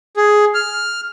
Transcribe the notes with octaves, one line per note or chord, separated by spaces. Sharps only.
G#4
F6